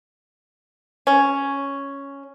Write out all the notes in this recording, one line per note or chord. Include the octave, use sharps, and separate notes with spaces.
C#4